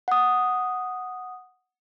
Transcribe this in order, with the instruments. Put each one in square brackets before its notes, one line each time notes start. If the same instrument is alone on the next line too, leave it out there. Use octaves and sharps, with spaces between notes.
[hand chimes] F#5 D#6